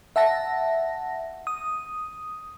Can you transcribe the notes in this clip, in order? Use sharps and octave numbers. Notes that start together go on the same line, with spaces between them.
E5 F#5 A5 A#6
D#6